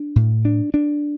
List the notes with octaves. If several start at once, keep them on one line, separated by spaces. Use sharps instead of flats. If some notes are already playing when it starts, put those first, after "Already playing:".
Already playing: D4
A2
D4
D4